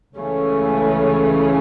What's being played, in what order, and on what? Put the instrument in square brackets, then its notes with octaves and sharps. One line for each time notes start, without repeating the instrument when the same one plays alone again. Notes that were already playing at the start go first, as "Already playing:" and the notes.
[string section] C#2 C#3 E3 A3 C#4